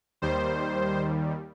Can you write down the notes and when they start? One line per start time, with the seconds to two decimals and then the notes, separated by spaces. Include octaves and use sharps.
0.22 D#2 D#3 G3 C5